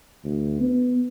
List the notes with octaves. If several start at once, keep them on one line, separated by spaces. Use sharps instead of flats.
D2
B3